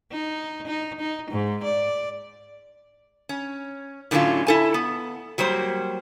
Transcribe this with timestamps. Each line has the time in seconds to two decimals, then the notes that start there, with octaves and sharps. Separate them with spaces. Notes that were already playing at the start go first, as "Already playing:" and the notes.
0.12 D#4
0.67 D#4
1.00 D#4
1.31 G#2
1.64 D5
3.29 C#4
4.11 A2 D3 F#3 B3 C#4 F4
4.47 E4 A4 G#5
4.74 B3
5.38 F#3 G3 A#3 C5